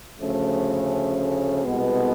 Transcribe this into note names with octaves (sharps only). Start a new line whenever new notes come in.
D2 C#3 F3 A3 C#4
C2 B2 G#3 B3